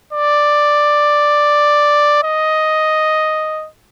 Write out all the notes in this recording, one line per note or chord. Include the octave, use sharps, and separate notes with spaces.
D5
D#5